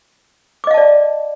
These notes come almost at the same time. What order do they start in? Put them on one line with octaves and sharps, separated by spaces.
D6 D#5 F5 A5 D5